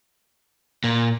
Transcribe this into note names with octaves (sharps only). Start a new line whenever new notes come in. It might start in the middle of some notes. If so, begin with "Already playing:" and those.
A#2